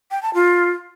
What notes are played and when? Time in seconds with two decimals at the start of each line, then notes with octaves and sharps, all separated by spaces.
0.11 G5
0.23 A5
0.34 F4